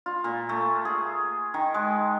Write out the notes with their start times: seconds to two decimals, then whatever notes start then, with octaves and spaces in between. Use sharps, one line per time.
0.06 F4
0.24 A#2
0.49 A3
0.85 G#4
1.54 D#3
1.74 G#3